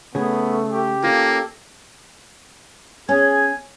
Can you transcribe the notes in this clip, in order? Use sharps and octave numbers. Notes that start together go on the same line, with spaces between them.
C#3 A3 B3 G#4
G4
A#3 C#4 F4 A4
C#4 G#4 G#5 G#6